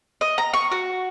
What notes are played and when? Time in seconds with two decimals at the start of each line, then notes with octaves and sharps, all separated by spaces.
0.21 D#5
0.38 A#5
0.54 C#6
0.71 F#4